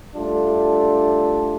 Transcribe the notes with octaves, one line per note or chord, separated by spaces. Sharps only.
G3 A3 D4 F4